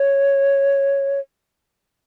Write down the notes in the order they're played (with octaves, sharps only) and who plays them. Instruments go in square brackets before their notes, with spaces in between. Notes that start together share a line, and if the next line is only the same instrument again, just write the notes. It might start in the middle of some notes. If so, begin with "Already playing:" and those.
Already playing: [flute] C#5